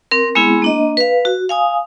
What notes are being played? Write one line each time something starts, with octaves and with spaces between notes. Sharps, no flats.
C4 A#4
G#3 B3 C4 E4 G#4
A#3 D4 D#5
B4 F5
F#4
F5 G#5 D#6